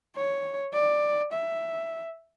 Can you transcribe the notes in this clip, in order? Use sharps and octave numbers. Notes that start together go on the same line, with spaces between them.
C#5
D5
E5